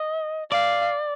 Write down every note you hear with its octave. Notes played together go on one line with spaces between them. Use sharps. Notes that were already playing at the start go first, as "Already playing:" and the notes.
Already playing: D#5
D5 F5